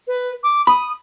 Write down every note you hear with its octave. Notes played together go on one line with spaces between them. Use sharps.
B4
D6
B5 D#6